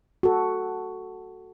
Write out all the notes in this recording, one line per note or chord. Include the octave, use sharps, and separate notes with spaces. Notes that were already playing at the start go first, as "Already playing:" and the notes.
F#4 A4